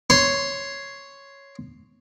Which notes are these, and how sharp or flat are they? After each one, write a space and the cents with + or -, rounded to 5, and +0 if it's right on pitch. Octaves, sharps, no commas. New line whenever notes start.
C#5 +0 C6 +0